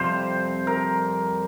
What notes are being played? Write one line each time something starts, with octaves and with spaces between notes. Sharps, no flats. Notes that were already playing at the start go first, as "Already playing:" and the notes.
Already playing: F2 C3 G3 C4 F4 C5
A#4